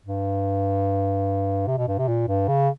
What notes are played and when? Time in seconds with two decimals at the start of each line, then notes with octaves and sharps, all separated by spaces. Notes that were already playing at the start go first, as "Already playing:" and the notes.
0.06 G2
1.67 C3
1.78 B2
1.88 G2
1.98 C3
2.08 A#2
2.28 G2
2.48 C#3